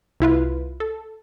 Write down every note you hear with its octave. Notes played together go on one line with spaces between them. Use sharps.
C2 E4 F4 B4
A4